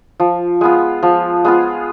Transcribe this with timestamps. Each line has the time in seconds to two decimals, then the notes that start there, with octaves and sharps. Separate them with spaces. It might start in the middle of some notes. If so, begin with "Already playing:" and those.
0.20 F3
0.61 G#3 B3 F4
1.03 F3
1.45 G#3 B3 F4